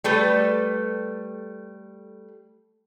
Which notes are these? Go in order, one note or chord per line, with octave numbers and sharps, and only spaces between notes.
G3 A3 A4 B4